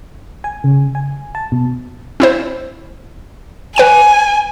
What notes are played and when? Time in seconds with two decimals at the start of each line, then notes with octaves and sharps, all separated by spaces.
0.44 G#5
0.64 C#3
0.95 G#5
1.35 A5
1.52 B2
2.20 C4 E4 C5
3.76 B4 G5 G#5 D#7